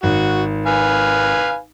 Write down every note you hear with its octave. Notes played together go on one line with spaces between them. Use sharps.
G#1 F#4
B4 F5 G#5